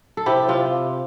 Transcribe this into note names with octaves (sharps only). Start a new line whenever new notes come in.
A4
C3 E4 G4
C3 F4